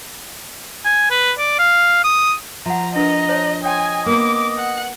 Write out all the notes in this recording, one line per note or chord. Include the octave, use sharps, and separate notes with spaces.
G#5
B4
D5
F5
D#6
F3 E5 F#5 A#5
D4 A#4 B4 D#5 A#5
C5 C#5 A5
C#5 D#5 G5 G#5 C6
A#3 B3 G#5 D6
F#5